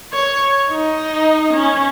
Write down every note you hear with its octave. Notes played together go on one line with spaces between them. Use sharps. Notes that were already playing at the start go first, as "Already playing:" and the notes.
C#5
D#4
C#4